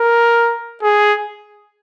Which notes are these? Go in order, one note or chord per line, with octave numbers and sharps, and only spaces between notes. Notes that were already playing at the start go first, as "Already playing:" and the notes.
Already playing: A#4
G#4